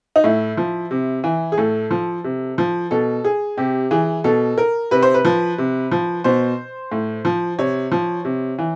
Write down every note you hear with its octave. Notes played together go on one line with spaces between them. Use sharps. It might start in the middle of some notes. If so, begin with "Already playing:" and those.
D#4
A2 E4
F3
C3
E3
G#4
A2 A4
F3
C3
F3
B2 A4
G#4
C3 G4
E3 G#4
B2 A4
A#4
C3 B4
C5
B4
F3
C3
F3
B2 C5
A2
F3
C3 C#5
F3
C3
E3